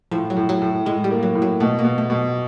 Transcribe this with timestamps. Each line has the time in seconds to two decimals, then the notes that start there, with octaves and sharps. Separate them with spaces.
0.12 A2 F3
0.30 F#3
0.37 A2
0.49 F#3
0.62 A2
0.86 A2 G#3
1.04 G3
1.11 A#3
1.23 F#3
1.35 A2
1.42 F#3
1.60 B2 A3
1.79 A#3
1.84 B2
1.98 A3
2.10 B2